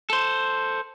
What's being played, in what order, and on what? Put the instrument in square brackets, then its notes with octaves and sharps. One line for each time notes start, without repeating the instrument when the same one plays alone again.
[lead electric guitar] A4 C5